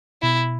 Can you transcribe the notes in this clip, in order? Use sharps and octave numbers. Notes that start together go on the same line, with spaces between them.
B2 E4